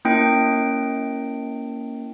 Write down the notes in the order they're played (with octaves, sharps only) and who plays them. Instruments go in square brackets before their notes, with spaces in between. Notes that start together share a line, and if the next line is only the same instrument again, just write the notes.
[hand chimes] A#3 C#4 E4 G5 D7